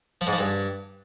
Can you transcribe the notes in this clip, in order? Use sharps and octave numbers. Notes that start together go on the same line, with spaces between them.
F3
G#2
F3
G2